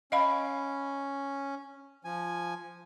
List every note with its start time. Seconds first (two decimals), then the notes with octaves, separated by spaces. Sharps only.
0.12 C#4 D#5 F5 B5
2.05 F3 G#5